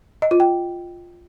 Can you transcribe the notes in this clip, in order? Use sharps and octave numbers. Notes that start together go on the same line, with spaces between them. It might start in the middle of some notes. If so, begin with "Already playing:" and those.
D#5
F4
G5